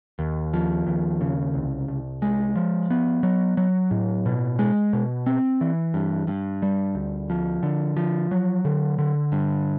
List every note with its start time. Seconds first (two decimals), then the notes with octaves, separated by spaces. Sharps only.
0.19 D#2
0.54 F3
0.86 D#2
1.21 C#3
1.54 C2
1.88 C2
2.22 G#3
2.56 F3
2.90 B3
3.23 F#3
3.57 F#3
3.91 A2
4.26 B2
4.59 G#3
4.93 B2
5.26 C4
5.61 E3
5.94 G2
6.27 G2
6.62 G3
6.95 D2
7.30 F3
7.63 D3
7.97 F3
8.31 F#3
8.65 D3
8.98 D3
9.32 G2